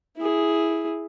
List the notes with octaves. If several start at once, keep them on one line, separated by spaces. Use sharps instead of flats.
E4 G#4